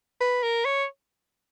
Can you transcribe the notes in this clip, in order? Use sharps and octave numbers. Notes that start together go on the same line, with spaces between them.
B4
A#4
C#5